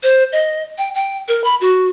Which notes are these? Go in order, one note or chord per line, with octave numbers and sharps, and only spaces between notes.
C5
D#5
G5
G5
A#4
B5
F#4